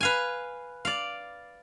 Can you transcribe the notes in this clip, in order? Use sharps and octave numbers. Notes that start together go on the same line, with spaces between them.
B4 F5 G#5
D5 F5